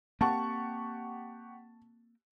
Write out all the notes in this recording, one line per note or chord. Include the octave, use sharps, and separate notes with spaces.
A#3 C4 G4 F#5 A5 C#6